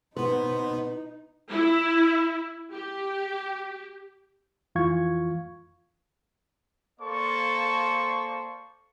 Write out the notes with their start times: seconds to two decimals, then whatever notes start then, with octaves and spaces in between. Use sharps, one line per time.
0.17 B2 B3 D#4 B4 C5
1.50 E4
2.73 G4
4.75 F2 E3 F4 F5 C#6 G#6
7.00 A#3 A4 C5 D5 C6 C#6